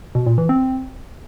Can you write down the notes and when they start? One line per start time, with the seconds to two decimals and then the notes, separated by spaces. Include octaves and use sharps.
0.15 B2
0.26 A#2
0.38 E3
0.49 C4